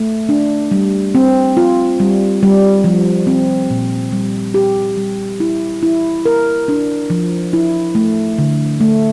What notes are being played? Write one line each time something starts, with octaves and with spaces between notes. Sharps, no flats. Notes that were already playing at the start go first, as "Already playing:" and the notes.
Already playing: A3
D4
G3
C4
F4
G3
G3
F3
C4
A#2
G3
G4
G3
E4
E4
A#4
D4
F3
E4
A3
D3
A3